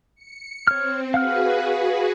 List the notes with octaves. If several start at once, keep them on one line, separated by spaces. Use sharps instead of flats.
C#7
C4 C#5 F6
F#4 G#4 B4 F5 F#5 F6